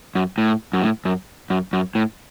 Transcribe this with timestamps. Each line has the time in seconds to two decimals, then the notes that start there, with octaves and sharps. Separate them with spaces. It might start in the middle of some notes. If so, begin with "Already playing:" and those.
0.15 F#2
0.38 A2
0.73 F#2
0.82 A2
1.05 F#2
1.50 F#2
1.73 F#2
1.95 A2